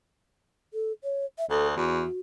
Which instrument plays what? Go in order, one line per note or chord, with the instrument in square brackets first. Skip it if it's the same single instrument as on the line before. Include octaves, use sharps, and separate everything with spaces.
[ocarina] A4
C#5
E5
[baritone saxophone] D2 [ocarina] A4
[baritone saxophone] E2 [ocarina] F#4